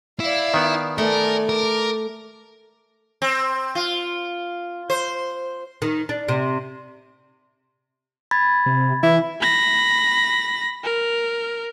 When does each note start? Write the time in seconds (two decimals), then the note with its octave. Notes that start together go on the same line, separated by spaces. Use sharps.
0.20 E4 D5 F5
0.54 D#3 B3
0.98 A3 A#4 D5 G#5
1.49 A#4 A5 D6
3.22 C4
3.75 F4
4.90 C5
5.82 D#3
6.09 D4
6.29 C3
8.31 B5 G#6 A6
8.66 C3
9.03 E3 E4
9.41 B5 A#6
10.84 A#4